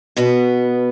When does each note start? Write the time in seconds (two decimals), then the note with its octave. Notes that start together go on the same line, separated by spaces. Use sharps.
0.17 B2 B3